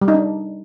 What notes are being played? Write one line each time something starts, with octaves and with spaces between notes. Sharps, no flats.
G3
D#4
D4